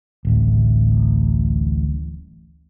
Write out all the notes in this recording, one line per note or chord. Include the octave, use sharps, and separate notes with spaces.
D1 A1